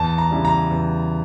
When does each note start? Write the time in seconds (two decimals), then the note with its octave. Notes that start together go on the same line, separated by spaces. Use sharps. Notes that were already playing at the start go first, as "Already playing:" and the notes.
Already playing: E2 A5
0.18 A#5
0.31 C#3 E3 G3
0.45 A#5
0.71 E2